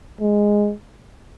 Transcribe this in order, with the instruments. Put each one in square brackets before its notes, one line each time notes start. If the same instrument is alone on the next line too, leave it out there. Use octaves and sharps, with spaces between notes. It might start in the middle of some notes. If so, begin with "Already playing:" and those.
[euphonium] G#3